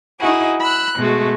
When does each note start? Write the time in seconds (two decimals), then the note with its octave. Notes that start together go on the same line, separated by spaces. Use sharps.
0.19 D#4 E4 F#4 G#4
0.60 B5 E6 F#6
0.96 B2 G#3 A3 F#4